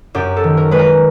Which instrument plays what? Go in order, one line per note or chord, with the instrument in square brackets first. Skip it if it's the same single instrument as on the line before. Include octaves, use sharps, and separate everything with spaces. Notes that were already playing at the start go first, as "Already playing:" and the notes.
[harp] F#2 G4
A4
D#3
A#4
G#3 B4
A#4